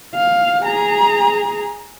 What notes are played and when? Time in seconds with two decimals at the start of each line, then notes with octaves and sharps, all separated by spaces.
0.15 F5
0.63 G#4 A#5